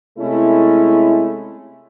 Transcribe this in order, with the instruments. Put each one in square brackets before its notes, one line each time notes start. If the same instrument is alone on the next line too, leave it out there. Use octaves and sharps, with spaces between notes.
[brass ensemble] C3 G#3 A3 C#4 E4